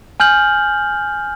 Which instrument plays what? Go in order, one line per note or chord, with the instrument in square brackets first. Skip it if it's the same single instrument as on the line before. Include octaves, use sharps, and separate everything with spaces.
[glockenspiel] G#5 F6 G6 F#7